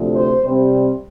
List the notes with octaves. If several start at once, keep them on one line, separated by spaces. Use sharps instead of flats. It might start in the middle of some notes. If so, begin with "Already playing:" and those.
Already playing: D2 C3 F3 A3
C5
C3 G3 C4